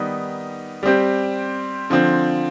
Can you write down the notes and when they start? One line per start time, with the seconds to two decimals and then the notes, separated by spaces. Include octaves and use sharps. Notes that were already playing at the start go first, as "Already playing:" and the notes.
Already playing: D#3 G3 B3 D#4
0.83 G3 C4 G4
1.90 D3 F3 C4